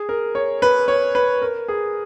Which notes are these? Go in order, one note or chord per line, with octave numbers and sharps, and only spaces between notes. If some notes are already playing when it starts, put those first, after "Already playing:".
Already playing: G#4
A#4
C#5
B4
C#5
B4
A#4
G#4